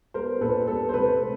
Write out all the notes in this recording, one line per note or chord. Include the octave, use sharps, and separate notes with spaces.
G3 B3 A#4 C5
A#2 A4 B4
G3 B3 A4
C5
C3 A4 B4
A3